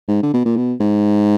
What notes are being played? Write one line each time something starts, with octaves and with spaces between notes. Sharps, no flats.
G#2
D3
B2
A#2
B2
G#2